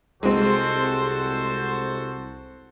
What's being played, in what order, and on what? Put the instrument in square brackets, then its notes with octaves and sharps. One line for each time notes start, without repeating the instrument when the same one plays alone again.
[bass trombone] C2 [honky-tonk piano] G#3 C4 [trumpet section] F#4 A4 C5